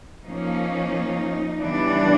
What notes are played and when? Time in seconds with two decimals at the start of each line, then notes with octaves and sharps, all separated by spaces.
0.25 F3 A#3 C#4 D#4
1.61 C#3 E3 G3 B3 D4